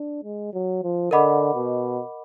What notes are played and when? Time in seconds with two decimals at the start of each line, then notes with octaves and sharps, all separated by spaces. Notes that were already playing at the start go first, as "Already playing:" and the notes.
Already playing: D4
0.24 G#3
0.53 F#3
0.83 F3
1.11 D3 A#4 D#5 F#5 B5 D6
1.55 B2